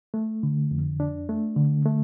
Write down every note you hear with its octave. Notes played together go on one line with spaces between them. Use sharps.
A3
D3
F2
D4
A3
D3
A3